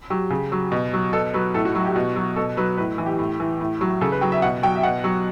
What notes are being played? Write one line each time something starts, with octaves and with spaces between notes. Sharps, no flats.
F#3 G4
C#3
F#3
B2
F#3
B2 A4
F#3 B4
A2 A4
F#4
F#3
G4
B2 F#4
F#3
B2 A4
F#3 B4
A2 B4
E3
G4
A2
E3
A2
F#3
C#3 A4
B4
F#3 G5
E5
B2 F#5
F#3 G5
E5
B2 F#5
F#3